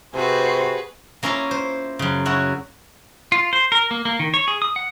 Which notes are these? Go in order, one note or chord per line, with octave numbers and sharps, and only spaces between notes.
C3 F#4 G#4 B4 C5
A#3 C#4 E4 F4 A#4
C5
F#2 C#3
C#4 E4 F#4
F4
C5
A#4
A#3
A#3
D#3
C#5
G#4
D#6
F#5